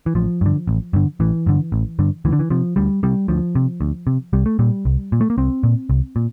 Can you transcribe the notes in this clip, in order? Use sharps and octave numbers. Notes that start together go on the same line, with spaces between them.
E3
A1 F3
G2 D3
A1
G2 D3
A1 E3
G2 D3
A1
G2 D3
D2 E3
D3
E3
C3 F3
D2 G3
C3 G3
D2 F3
C3
D2
C3
C2 G3
A3
A#2 G3
C2
A#2
A3
A#3
C2 C4
A#2
C2
A#2